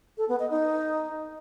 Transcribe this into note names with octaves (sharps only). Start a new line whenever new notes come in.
A4
B3
D#5
D#4